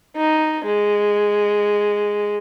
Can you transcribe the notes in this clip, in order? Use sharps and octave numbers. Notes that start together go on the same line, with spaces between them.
D#4
G#3